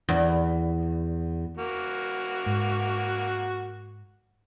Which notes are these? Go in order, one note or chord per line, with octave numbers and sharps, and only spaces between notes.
E2
A#3 F#4
G#2